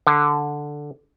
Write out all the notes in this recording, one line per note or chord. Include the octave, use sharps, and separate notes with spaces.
D3